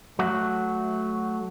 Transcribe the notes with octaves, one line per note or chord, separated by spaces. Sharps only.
F#3 A3 F#4